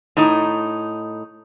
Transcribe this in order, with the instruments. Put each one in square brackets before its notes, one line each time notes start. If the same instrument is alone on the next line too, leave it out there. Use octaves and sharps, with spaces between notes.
[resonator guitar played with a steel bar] A2 D#4